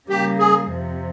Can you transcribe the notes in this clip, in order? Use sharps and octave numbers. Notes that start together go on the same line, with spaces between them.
C#3 G3 A#3 G4
G#4
F2 C3 F3